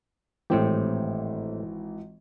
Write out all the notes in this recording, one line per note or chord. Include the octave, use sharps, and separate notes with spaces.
G#1 A2 E3 C4 G4